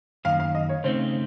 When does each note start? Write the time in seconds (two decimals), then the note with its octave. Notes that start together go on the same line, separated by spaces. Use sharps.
0.25 F#2 D#3 A#3 F5
0.40 F5
0.55 D#5
0.69 C#5
0.84 C#3 A3 C4 D#4 C5